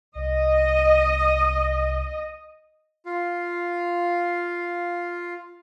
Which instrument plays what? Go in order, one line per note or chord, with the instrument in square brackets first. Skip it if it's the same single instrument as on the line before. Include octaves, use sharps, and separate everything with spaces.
[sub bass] C2 [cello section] D#5
[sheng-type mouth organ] F4 F5